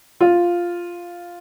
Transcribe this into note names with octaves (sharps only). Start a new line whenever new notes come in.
F4